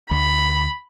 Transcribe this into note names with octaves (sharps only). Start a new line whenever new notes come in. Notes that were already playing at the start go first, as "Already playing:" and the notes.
D2 B5